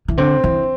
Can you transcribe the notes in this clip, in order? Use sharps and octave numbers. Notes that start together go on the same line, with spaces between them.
E3
D3 C4
E3